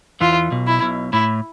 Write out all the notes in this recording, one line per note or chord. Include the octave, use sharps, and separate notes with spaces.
E2 E3 F4
B1 B2
E4
B1 B2
A2 E4